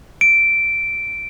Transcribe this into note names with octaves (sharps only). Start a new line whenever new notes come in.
D7